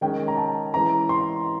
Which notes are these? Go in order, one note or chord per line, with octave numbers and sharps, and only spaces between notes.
D#3 G#3 C#4 G5
A#5
A5
E3 G#3 C#4 E4 A#5
C6